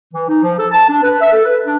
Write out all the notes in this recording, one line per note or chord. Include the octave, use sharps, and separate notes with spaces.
E3
D#4
F3
A4
A5
D4
B4
E5
A4
B4
D4